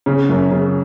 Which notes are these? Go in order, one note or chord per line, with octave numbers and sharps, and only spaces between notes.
C#3
F#2
C#3